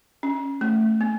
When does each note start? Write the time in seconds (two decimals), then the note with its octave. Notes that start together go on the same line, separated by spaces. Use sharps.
0.23 C#4
0.61 A3
1.01 B3